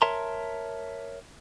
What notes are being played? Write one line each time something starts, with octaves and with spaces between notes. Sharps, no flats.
A#4 C#5 E5 A5 A#5 C6